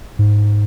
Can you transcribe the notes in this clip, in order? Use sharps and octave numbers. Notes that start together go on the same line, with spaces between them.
G#2